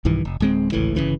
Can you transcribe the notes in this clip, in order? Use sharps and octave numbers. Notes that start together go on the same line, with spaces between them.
B1 G2 D#3 E3
F1
D1 G#3 C4
G#1 C#2 A2 E3
G1 D#2 C#3 E3